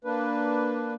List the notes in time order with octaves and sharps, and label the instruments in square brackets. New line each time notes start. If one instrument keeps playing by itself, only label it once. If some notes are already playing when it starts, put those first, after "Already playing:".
[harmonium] A#3 D4 B4